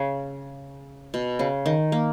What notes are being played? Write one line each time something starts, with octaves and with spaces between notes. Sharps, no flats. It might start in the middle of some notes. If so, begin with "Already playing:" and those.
Already playing: C#3
B2
C#3
D#3
A#3